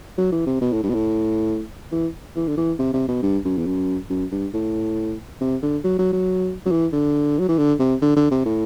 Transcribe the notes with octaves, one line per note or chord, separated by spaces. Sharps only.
F#3
E3
C3
B2
A2
G2
B2
A2
E3
E3
D3
E3
C3
C3
B2
G2
F#2
E2
F#2
F#2
G2
A2
C3
D3
F#3
F#3
F#3
F#3
E3
D3
F#3
E3
D3
C3
D3
D3
C3
A2